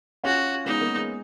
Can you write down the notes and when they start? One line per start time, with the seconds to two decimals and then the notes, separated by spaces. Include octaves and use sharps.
0.24 C#4 F4 F#4
0.66 G#3 B3 D#4
0.81 A#3
0.96 G#3